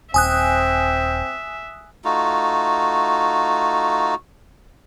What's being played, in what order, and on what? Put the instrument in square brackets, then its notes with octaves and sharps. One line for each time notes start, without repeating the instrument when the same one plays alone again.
[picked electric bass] D#1 [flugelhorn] C4 [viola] E5 [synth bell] G#5 D#6 F#6
[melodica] A3 D#4 F4 F#4